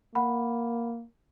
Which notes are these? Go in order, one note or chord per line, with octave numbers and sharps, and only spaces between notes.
A#3 F#5 B5